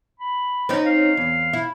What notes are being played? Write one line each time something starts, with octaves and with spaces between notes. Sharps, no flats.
B5
C4 C#4 D#4
F5
E2
E4